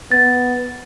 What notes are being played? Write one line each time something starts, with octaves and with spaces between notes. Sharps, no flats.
B3 A6